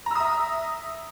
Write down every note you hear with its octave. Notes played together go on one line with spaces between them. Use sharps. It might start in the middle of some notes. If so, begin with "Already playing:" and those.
E5 A#5 D#6 E6